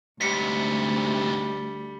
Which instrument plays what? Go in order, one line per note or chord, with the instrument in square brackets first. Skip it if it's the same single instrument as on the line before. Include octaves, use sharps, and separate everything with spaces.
[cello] D2 [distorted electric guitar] G#2 C3 [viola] G3 [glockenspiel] B6 C#7